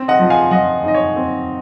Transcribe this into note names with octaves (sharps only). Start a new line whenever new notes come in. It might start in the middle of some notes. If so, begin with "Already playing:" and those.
Already playing: C4
D#5 F#5
F3
F5 G#5
F3 D#5 F#5
D#4 D#5
C#5
C4